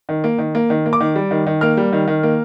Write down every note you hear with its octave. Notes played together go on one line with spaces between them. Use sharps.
D#3
A#3
D#3
A#3
D#3
A#3
D6
D#3
G3
D#3
D#3
A#3 F6
G3
D#3
D#3
A#3